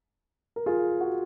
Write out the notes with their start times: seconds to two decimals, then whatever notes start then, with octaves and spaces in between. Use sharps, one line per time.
0.56 A#4
0.66 F4 G#4
1.01 F#4